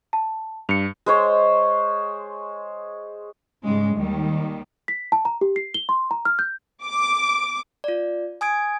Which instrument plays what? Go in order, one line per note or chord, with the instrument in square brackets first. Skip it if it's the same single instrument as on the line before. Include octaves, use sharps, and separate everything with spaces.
[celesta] A5
[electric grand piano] G2 [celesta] C#7 F7
[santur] G#3 C5 C#5
[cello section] G#2 C#3 G3 G#3
D#2 D#3 G3
[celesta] B6
A5
A#5
G4
C7
G7
C6
A#5
F6
G6
[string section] D6
[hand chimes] F4 D5
G#5 D#6 G#6 D7